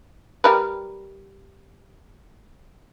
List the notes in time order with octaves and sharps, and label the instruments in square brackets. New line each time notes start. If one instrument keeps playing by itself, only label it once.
[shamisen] G3 A#4 B4